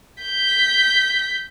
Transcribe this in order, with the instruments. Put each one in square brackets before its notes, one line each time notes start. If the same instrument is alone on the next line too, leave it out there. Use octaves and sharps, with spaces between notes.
[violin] G6 B6